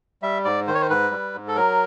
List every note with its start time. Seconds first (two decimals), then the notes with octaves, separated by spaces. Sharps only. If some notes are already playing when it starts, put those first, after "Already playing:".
0.22 G3 E5
0.45 G#2 D5
0.67 D#3 C5
0.74 C#5
0.82 C5
0.90 G#2 B4
1.11 G3
1.34 G#2
1.48 A4
1.56 F#3 A#4